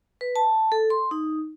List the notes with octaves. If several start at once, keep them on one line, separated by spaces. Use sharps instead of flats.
B4
A5
A4
C6
D#4